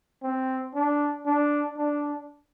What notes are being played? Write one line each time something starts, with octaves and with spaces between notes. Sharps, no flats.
C4
D4
D4
D4